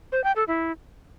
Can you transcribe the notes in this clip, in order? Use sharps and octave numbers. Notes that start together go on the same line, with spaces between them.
C5
G5
A4
E4